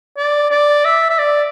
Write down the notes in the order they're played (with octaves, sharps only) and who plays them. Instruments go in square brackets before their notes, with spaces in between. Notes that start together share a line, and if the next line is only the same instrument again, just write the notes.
[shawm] D5
D5
E5
E5
D5